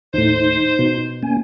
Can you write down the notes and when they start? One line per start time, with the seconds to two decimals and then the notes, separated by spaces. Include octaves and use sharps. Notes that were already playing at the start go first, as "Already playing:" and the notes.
0.14 D#2 A2 D#4 C5
0.79 B2
1.23 A#3 C#4 G#5